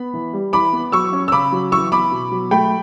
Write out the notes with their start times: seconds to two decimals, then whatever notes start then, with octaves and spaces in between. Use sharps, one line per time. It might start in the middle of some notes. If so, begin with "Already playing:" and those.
Already playing: B3 B5
0.14 E3
0.33 G3
0.53 E3 B5 D6
0.73 B3
0.92 F#3 C#6 E6
1.13 C#4
1.28 E6
1.32 C#3 B5 D6
1.52 F#3
1.72 E3 C#6 E6
1.92 B3 B5 D6
2.12 B2
2.32 F#3
2.51 A3 G5 B5